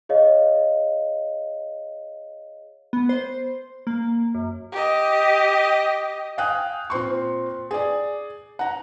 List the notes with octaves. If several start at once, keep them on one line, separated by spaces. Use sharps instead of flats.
G#4 C#5 D#5 F5
B3
C5
A#3
F#2
G4 D#5
F5 G5 G#5 D#6 F#6
A#2 C4 C6 C#6
G#4 D5
F#5 A#5